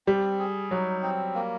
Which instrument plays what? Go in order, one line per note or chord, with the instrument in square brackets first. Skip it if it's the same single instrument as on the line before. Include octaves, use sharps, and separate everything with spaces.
[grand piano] G3 [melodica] C4
[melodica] G#4
[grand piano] F#3 [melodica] D#4
[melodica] C4
A#3